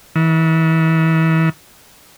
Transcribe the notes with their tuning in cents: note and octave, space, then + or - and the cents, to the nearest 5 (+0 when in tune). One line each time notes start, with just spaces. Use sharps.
E3 -35